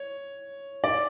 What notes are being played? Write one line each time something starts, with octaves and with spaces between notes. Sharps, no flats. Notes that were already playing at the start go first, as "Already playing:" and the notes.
Already playing: C#5
D5